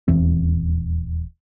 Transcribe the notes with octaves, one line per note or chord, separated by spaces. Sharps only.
D#1 E2 E3 C4